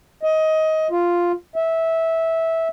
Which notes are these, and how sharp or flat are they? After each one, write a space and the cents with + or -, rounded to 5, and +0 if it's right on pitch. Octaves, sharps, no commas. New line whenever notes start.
D#5 +20
F4 +0
E5 -15